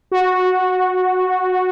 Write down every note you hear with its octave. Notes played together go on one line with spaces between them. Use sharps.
F#4